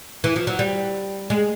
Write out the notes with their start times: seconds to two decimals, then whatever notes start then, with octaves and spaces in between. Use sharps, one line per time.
0.24 E3
0.36 F3
0.47 F#3
0.59 G3
1.30 G#3